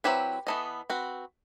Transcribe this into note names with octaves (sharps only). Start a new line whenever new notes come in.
F#3 C4 E4 G4 B4
E3 B3 D#4 A4 D#5
C4 F#4 B4